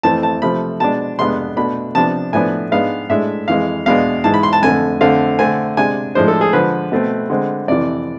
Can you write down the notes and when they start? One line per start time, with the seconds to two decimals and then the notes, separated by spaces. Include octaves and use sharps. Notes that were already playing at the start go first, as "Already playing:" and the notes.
0.03 F2 E3 A3 C4 A5
0.23 A5
0.42 C3 F3 A3 B5
0.80 B2 G#3 D4 A5
1.19 F2 C3 G#3 B3 D4 C6
1.56 B2 A3 D4 B5
1.95 C3 F3 B3 D4 A5
2.33 A2 F3 B3 D4 G#5
2.72 G#2 G#3 B3 D4 F5
3.10 A2 G#3 D4 E5
3.48 F2 E3 G#3 F5
3.86 E2 B2 G#3 B3 D4 F5
4.24 G#2 E3 G#3 A5
4.34 B5
4.43 C6
4.53 A5
4.62 F2 D3 A3 G#5
5.00 F2 D3 A3 C4 F5
5.39 D3 A3 C4 G#5
5.77 C3 G#3 D4 G#5
6.15 A2 F3 G#3 D4 C5
6.28 A4
6.41 G#4
6.53 D3 F3 G#3 B4
6.92 B2 A3 C4
7.30 D3 G#3 C4
7.68 F2 C3 E3 D5